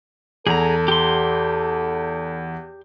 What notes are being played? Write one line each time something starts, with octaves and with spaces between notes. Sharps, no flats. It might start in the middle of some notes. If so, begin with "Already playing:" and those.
E2 G#4 A4 A#5
G4 C6